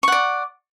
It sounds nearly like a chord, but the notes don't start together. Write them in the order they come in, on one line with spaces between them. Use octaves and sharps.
C#6 F#5 D5